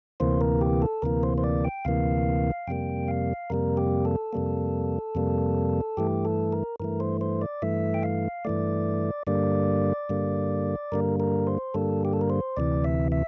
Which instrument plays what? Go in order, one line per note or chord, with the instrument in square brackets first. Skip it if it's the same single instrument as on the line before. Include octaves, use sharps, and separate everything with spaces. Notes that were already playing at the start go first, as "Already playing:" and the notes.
[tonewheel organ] D2 C3 E3 A#3 C5
A#4
G4
A4
D2 C3 E3 A#3 A#4
C5
C5
D5
G5
D2 C3 E3 A#3 F5
F2 C3 G3 A#3 G5
F5
F2 C3 G3 A#3 A#4
G4
A4
F2 C3 G3 A#3
F2 C3 G3 A#3
G2 E3 A3 G4
A4
A#4
G2 E3 A3 A#4
C5
C5
D5
G2 E3 A3 E5
G5
F5
G2 E3 A3 D5
G2 D3 G3 A#3 D5
G2 D3 G3 A#3
G2 D3 G3 A#3 A#4
A#4
C5
G2 D3 G3 A#3 A4
G4
A4
A#4
C5
D2 C3 E3 D5
E5
E5